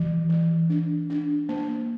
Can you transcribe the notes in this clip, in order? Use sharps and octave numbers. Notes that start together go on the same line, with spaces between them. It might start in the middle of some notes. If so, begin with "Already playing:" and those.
Already playing: E3
E3
D4
D4
A#3